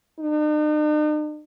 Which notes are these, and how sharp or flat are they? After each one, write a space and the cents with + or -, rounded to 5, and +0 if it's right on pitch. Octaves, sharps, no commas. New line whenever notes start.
D#4 -45